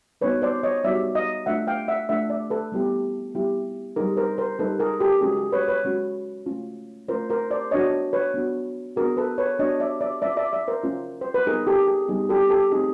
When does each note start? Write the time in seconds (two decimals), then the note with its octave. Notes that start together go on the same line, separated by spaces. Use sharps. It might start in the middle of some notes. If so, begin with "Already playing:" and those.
0.21 G3 B3 D#4 F#4 B4 C#5
0.42 C5 D5
0.63 C#5 D#5
0.84 G3 B3 D#4 F#4 D5 E5
1.15 D#5 F5
1.46 A3 D4 F4 E5 F#5
1.67 F5 G5
1.88 E5 F#5
2.09 A3 D4 F4 E5 F#5
2.30 D5 E5
2.50 A4 B4
2.72 G3 B3 E4 G4
3.34 G3 B3 E4 G4
3.96 G3 A#3 D#4 G#4 A#4
4.17 A#4 C5
4.38 A#4 C5
4.59 G3 A#3 D#4 A4 B4
4.80 G#4 A#4
5.00 G4 A4
5.21 G#3 C#4 F#4 G#4
5.37 G#4
5.52 B4 C#5
5.68 B4 C#5
5.84 G#3 C#4 F#4
6.46 A3 C#4 F4
7.08 A3 C#4 F4 A#4 C5
7.30 A#4 C5
7.51 C5 D5
7.71 B3 D4 F#4 C#5 D#5
8.13 B4 C#5
8.34 B3 D4 F#4
8.96 B3 D4 F#4 G#4 A#4
9.17 A4 B4
9.38 B4 C#5
9.59 B3 D4 F#4 C#5 D#5
9.80 D5 E5
10.01 D5 E5
10.22 A#3 C#4 F4 D5 E5
10.37 D5 E5
10.53 D5 E5
10.68 A#4 C5
10.83 A#3 C#4 F4
11.21 C5
11.34 B4
11.47 G3 B3 D#4 G#4 A#4
11.67 G4 A4
11.88 G#4
12.08 G3 B3 D#4 G#4
12.29 G4 A4
12.50 G4 A4
12.71 A3 C4 D#4 G4 G#4